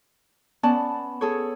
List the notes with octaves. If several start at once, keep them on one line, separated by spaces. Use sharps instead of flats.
B3 C#4 D5 A5
G#4 A4 C#5